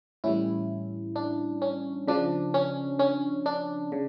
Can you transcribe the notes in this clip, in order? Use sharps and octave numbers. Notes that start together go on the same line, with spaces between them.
A2 E3 G3 C#4 E4
D4
C#4
C#3 F3 D4
C#4
C#4
D4
C#3